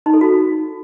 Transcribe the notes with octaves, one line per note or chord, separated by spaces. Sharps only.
D#4
A4
F#4